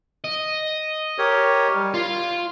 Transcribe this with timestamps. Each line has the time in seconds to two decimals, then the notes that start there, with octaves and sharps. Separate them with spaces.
0.24 D#5
1.18 G4 A#4 C#5
1.75 G3
1.94 F4 C6